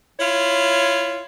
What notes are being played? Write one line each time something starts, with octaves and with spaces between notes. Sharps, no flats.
E4 F4 C#5